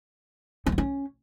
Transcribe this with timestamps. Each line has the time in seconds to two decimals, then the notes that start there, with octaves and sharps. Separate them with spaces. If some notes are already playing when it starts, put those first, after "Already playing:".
0.66 C4
0.72 B3
0.78 C#4